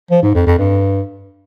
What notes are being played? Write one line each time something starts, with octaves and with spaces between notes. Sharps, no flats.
F3
G#2
F2
F2
G2